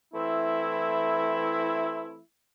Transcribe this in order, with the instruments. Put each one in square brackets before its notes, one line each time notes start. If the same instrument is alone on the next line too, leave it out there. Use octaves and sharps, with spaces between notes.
[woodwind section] E3 A3 C4 E4